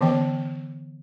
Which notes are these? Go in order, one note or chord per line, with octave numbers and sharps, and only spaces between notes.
D3 E3 B3 D5 G5